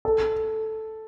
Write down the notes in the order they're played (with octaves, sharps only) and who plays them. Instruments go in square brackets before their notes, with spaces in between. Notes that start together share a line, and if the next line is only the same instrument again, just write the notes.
[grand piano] A4